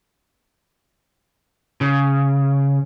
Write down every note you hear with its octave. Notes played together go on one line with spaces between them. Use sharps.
C#3